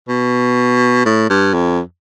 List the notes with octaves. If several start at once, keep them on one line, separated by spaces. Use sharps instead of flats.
B2
A2
G2
F2